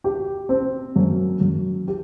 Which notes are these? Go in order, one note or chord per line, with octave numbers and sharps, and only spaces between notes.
G4
C4
F#2
F#2
G4